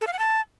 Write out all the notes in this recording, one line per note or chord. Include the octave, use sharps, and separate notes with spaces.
A4
F5
F#5
A5